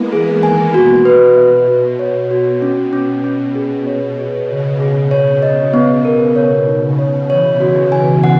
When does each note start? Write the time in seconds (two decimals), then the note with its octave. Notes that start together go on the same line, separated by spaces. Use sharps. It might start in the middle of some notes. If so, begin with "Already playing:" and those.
Already playing: G#3 A#3 B3 E4
0.11 E3 G#4
0.43 D#3 G#5
0.74 B2 F#4
1.05 B4
1.37 E5
1.68 F#4
1.99 C#5
2.31 F#4
2.62 C#4
2.93 C#4
3.24 C#4
3.55 G#4
3.87 C#5
4.18 G#4
4.49 C#3 C#5
4.80 G#4
5.11 C#5
5.42 B2 D#5
5.74 B3
5.89 C#3
6.05 A#4
6.36 B2 C#5
6.67 D#4
6.83 C#3
6.99 C#5
7.30 E3 C#5
7.60 F#4
7.77 C#3
7.92 G#5
8.24 F#5